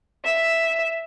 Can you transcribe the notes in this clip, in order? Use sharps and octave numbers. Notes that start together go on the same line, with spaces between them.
E5